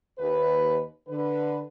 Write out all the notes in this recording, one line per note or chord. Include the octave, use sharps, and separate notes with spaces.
D#2 B4
D3 B4